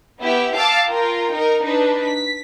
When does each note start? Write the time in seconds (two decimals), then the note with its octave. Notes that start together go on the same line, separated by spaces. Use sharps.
0.20 B3 E4 G4 E5
0.54 F5 G5 A5 D6 E6 A6
0.88 F4 A#4 G5
1.32 D#4 A#4
1.63 D4 D#4 B4
2.02 B6